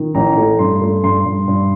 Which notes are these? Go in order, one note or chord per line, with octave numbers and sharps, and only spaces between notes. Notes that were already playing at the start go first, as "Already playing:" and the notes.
Already playing: D#3
A1 A#5
A3
G2 C6
A3
G2 C6
G2
G2